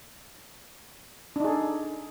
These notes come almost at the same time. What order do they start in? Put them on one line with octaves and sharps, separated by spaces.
D4 D#4 G#4 A4